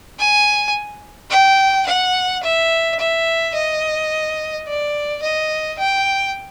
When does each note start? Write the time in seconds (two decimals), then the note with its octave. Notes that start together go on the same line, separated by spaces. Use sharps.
0.19 G#5
1.31 G5
1.87 F#5
2.43 E5
2.99 E5
3.54 D#5
4.67 D5
5.22 D#5
5.79 G5